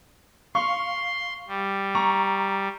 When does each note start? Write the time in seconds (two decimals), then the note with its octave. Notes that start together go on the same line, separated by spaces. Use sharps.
0.55 F5 C6 C#6
1.48 G3
1.95 A#5 C#6